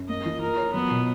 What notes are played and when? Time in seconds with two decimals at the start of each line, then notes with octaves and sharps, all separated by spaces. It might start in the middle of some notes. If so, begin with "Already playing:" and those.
Already playing: F#2
0.08 A#3 D#5
0.25 F3
0.41 F4 A#4
0.57 C#5
0.74 F#3 B3
0.90 B2